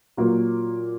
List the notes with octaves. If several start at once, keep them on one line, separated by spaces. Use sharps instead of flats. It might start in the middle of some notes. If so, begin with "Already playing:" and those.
A#2 F#3 A#3